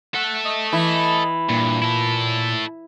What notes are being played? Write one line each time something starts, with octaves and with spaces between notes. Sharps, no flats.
A4 E5 F#5
D#5
E3
G2 A#2
E4 A4